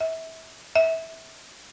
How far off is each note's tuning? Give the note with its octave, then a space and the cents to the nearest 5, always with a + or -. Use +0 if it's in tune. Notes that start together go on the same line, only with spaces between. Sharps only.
E5 -30
E5 -20